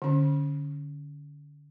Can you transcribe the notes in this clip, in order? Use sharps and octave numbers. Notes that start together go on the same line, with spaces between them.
D3 C#4